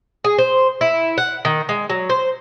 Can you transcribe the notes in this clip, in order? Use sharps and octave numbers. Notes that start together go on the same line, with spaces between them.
G#4
C5
E4
F#5
D#3
G#3
F#3
C5